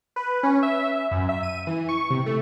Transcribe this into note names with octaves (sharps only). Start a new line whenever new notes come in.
B4
C#4
E5
E5
F#2
E5
D#7
E3
C#6
C3
A3